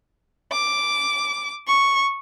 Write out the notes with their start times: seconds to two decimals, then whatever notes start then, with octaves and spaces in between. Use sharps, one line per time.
0.52 D6
1.68 C#6